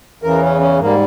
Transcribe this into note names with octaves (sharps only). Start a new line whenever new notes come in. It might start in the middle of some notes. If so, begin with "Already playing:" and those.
E2 C#3 E3 A#4
C#4
C#4
G#2 G3 A#3